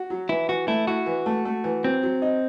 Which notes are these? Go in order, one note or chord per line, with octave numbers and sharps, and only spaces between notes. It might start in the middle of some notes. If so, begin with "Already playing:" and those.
Already playing: F#4
F#3
E3 E4
E3 F#4
A3 E4
E4 F#4
E3
A3
A3
E3
F#3 C4
F#3
D#4